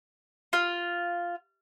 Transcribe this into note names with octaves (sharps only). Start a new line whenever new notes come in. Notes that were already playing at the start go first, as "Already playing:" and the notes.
F4